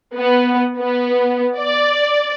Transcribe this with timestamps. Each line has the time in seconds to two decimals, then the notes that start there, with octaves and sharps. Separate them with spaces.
0.16 B3
0.79 B3
1.58 D5